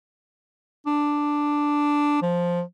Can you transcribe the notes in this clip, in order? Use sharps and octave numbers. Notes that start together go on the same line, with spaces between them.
D4
F3